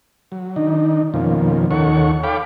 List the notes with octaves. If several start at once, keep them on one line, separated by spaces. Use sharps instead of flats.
F#3
D#3 D4 D#4
F2 B2 D#3 F3 A#3 C#4
D#2 D#3 A4 C#5 F#5 C#6
A4 C#5 F5 G5 B5 D6